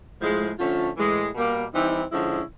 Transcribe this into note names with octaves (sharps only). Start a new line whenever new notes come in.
A2 F3 G#3
D3 F3 A3 C#4 F4
A2 E3 G#3
B2 G3 A#3
E3 G3 C4 D#4
D3 F3 G#3 C#4 E4